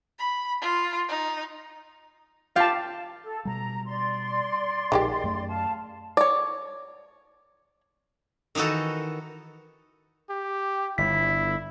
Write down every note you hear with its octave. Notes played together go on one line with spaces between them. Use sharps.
B5
F4
D#4
F4 G4 F5 A5
A4
B2 G3 A#5
D5 C6
A#1 A#2 D#3 G#3 G4
F#2 A3
F5 A5
C#5 D5
D#3 E3 D#4 F#4 A4
G4
G1 E4 B6